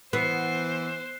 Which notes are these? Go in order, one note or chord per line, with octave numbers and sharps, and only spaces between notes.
E3 B3 C5 F#6 C7